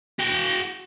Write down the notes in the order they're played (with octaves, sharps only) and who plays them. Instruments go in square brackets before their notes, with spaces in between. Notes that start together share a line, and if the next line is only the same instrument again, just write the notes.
[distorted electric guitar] F#4 G5